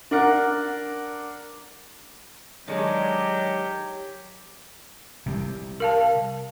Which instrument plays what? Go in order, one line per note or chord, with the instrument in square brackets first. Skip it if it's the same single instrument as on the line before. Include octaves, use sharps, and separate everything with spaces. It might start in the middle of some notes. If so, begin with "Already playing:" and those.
[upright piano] D4 A#4 F#5
[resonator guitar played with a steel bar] D#3 G#3 D4 [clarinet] F#3 [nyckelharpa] G4
[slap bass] C3 G3
[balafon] A#4 F5 A5